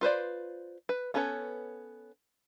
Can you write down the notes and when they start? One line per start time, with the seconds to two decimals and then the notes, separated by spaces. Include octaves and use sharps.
0.01 F4 B4 C5 D5
0.89 B4
1.14 B3 C#4 A4 B4 C#5